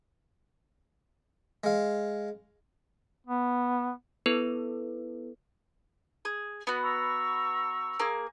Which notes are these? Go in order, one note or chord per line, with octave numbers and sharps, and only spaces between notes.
G#3 F5
B3
B3 E4 A4 B4
G#4
B3 F#4
A#5 C#6 E6
A#3 G#4